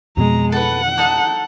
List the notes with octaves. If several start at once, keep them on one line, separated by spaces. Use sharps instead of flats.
F2 B2 G#3 A#5
A4 B4 F#5
D#4 A4 F#6